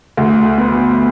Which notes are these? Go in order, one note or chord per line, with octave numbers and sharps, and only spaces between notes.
D2
B3